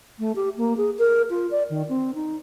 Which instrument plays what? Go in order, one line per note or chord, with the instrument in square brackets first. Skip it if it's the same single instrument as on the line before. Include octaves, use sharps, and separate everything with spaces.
[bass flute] A3
G4
A#3
G#4
A#4
F4
D5
D#3
C4
D#4